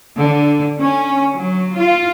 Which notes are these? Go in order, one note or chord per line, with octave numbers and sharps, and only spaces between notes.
D3
C#4
F#3
F4